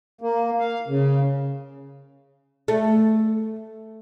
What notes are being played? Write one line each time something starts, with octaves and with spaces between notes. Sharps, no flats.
A#3
F5
C#3
A3